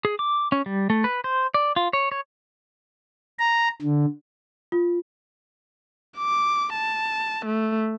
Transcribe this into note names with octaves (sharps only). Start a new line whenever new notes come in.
G#4
D6
C#4
G3
A3
B4
C5
D5
F4
C#5
C#5
A#5
D3
F4
D6
A5
A3